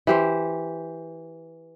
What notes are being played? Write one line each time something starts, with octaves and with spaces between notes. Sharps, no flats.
E3 G4 C5